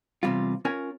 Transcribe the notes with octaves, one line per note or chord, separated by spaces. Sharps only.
E2 G2 C3 G3 F4
C#4 F4 A#4 G#5